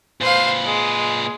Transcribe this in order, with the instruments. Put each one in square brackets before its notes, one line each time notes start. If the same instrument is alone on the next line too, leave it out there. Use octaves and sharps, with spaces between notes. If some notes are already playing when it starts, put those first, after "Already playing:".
[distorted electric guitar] A#2 B4 [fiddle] C5 F5
[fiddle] G#3